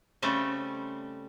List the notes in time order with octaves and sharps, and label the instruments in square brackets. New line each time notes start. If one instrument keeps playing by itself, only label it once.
[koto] C#3 G3 A3 C4 A4